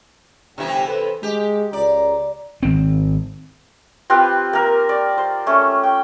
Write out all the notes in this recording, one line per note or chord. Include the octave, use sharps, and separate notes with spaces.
G1 C3 E3 E4 G4 G5
A4 B4 C5
G#3 G4
C#2 D5 A#5
G#1 C4
C4 F4 G4 B4
A#3 A#4
D5
C5
A3 C#4
G5